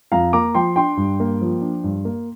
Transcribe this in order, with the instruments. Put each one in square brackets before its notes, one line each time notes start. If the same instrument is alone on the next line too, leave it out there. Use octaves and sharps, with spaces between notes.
[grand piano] F2 F5 A#5
A#3 A#5 D6
F3 G5 C6
D4 G5 C6
G2
A#3
F3
D4
G2
A#3